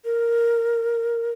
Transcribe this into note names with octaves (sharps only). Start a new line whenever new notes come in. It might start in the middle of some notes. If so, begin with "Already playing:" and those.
A#4